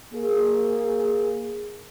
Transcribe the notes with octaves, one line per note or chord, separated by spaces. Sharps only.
A#3 G#4